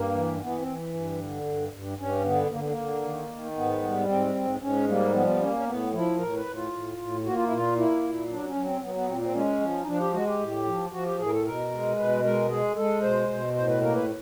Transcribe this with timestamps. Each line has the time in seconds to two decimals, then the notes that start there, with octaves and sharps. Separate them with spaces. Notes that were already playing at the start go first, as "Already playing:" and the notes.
Already playing: G2 A#3
0.14 E3
0.40 E3 B3
0.58 C4
0.68 E3
0.94 G2
1.20 D3
1.45 G2
1.73 G2
1.98 G2 C#4
2.24 D3 B3
2.51 D3 A#3
2.60 B3
2.68 A#3
2.77 D3
3.03 D#3
3.29 D#3
3.56 G#2 B3
3.82 G3
4.08 G#2 C4
4.35 G#2
4.61 G#2 C#4
4.88 G3 A#3
5.13 F3 B3
5.27 B3
5.40 A#3 C#4
5.53 C#4
5.66 A2 B3
5.93 F3 E4
6.19 A2 A#4
6.36 B4
6.46 A2
6.54 F4
6.72 A2
6.97 A2
7.24 A#3 F#4
7.34 F4
7.44 E4
7.51 A#2 F4
7.76 A#3 E4
8.03 A#2
8.30 F#3 D4
8.47 C#4
8.56 F#3
8.65 C4
8.81 F#3 B3
8.95 B3
9.08 A#2 C4
9.21 C4
9.34 G#3 C#4
9.61 F3
9.82 D#4
9.87 F3 D4
10.00 G4
10.13 G#3 F#4
10.26 G4
10.39 A2
10.66 F3
10.91 F3 F#4
11.05 G4
11.18 A2 G#4
11.26 A#4
11.31 A4
11.45 B2 A#4
11.71 G#3
11.97 B2 B4
12.23 G#3 A#4
12.49 G#3 G#4
12.76 G#3 A4
13.02 B2 C5
13.29 B2
13.54 A2 C5
13.68 B4
13.81 A#3 A#4
13.94 B4